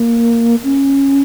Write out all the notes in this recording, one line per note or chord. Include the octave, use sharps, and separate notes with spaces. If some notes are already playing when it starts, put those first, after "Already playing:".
Already playing: A#3
C#4